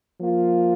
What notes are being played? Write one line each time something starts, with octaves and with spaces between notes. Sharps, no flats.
F3 A#3 F4